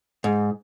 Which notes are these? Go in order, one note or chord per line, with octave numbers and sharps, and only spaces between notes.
G#2